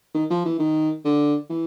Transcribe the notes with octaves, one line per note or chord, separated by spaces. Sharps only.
D#3
F3
E3
D#3
D3
E3